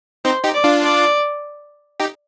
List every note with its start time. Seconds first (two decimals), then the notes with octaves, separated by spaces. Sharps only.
0.25 C4 D#4 C5
0.44 D#4 G4
0.54 D5
0.64 D4 F4
0.83 D5
2.00 D#4 G4